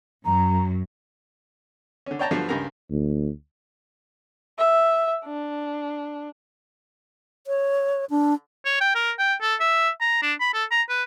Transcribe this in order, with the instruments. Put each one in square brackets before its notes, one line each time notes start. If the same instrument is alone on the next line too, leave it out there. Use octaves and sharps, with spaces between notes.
[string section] F#2 [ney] A#5
[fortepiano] D3 C#4
C#5 D5 G5 A5 A#5
G2 D3 F3 F#3 A3 B3
C#2 G2 G4 A#4 A#5
[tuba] D2
[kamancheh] E5
D4
[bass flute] C#5
D4
[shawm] C#5
G5
A#4
G5
A4
E5
A#5
D4
B5
A4
A#5
B4